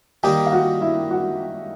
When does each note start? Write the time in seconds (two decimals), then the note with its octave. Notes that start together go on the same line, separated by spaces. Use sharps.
0.23 D#3 G3 A#3 D#4 G4 G5
0.46 F5
0.52 F#4 F#5
0.81 E4 E5
1.11 F#4 F#5